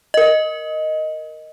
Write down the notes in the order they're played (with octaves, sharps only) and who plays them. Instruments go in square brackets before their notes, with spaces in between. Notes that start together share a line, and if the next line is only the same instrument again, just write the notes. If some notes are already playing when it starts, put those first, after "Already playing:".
[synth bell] A#4 D#5